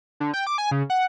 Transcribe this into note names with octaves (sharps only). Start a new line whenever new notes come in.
D3
G5
D6
G#5
C#3
F#5